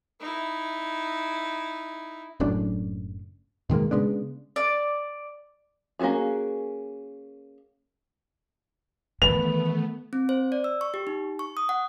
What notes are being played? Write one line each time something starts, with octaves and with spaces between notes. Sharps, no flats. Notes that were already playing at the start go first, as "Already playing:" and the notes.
D#4 E4
F#1 F#2 A2 D4
B2 D#3 G#3 A#3
C#3 G#3 B3 D4
D5
A#3 C#4 F4 F#4 G#4
D#3 E3 A3 B3 B4 F7
C4
C5
D5
E6
C#6
G4
D#4
C#6
D#6
F#5